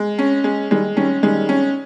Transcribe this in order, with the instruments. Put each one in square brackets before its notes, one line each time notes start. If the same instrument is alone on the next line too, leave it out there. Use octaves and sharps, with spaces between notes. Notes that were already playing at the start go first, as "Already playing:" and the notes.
Already playing: [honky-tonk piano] G#3
C#4
G#3
[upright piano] D#3 G3 [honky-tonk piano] G#3
[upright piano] D#3 G3 [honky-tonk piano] C#4
[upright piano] D#3 G3 [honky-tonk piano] G#3
[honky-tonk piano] C#4